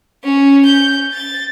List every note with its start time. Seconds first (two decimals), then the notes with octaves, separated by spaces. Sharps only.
0.24 C#4
0.65 G6
1.13 A6